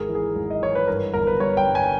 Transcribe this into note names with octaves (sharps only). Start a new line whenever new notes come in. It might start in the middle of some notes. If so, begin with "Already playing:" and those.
Already playing: G#1 G#4 A#4
E3
G#4
G#1
D#5
E3 C#5
B4
G2 A#4
G1 A#4
B4
G3 C#5
G5
G2
G#5